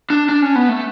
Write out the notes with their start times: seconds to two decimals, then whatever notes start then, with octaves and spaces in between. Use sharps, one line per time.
0.10 D4
0.29 D4
0.42 C#4
0.56 B3
0.69 A3